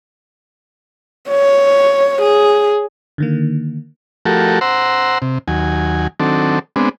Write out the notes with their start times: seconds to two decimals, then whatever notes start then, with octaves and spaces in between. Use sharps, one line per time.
1.30 C#5
2.22 G#4
3.18 D3 D#3 A#3
4.26 F3 A3 F#4 G4 A4 A#4
4.61 C5 F#5 A#5 C6 E6
5.22 C3
5.48 D#2 F#3 G#5
6.20 D#3 F#3 C4 D4 A4
6.76 G#3 B3 C4 D4